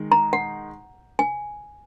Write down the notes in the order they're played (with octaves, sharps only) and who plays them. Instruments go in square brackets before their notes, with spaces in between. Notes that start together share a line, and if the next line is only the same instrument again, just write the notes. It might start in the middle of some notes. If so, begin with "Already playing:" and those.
Already playing: [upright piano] D#3 G#3 D#4
[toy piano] A#5
F#5
G#5